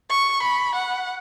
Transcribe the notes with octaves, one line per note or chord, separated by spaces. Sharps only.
C#6
B5
F#5